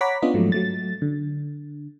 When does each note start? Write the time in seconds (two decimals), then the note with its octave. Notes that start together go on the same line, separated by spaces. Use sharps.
0.01 C#5 F#5 A#5 B5 D6 B6
0.22 B3 C#4 D4 F4 D#5
0.34 G#2 F3 F#3 A3
0.52 F#3 A3 A6
1.02 D3